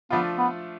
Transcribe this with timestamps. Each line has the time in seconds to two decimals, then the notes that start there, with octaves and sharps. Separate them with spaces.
0.10 F3 A3 B3 D4 F4
0.38 B3